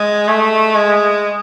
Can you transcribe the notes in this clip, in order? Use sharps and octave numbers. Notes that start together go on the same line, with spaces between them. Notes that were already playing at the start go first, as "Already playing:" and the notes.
Already playing: G#3
A3
G#3